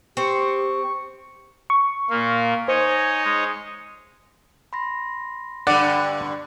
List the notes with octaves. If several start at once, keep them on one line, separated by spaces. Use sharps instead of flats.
C4 G4 C#6
C#6
A#2 A#3 F5
D#4 C5 C#5 D#5 G#5
G#3
B5 C6 A#6
G2 D3 D5 F#5 D6